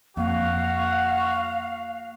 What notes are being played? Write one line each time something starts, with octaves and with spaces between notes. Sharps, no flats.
F2 A#3 F#4 F5